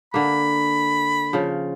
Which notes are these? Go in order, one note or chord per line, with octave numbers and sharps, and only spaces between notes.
D3 A#3 B5
C#3 F3